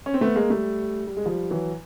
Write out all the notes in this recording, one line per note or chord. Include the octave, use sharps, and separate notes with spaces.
C#4
C4
A3 B3
G#3 A#3
G3 A3
G3
G#3
F3 G3
E3 F#3